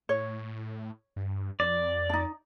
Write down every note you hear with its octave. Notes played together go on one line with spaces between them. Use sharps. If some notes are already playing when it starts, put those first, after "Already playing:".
A2 C#5
G2
F2 D5
D4 D#4